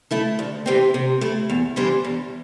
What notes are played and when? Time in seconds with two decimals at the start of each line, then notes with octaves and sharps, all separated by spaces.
0.11 A3 E4 A4
0.39 D2
0.66 C3 E3 C4
0.94 C3
1.21 A3 E4
1.50 E2
1.76 E3 G3 D4 C5
2.05 E2